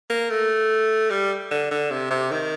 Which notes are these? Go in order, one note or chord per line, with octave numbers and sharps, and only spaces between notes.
A#3
A3
G3
D3
D3
C3
C3
D#3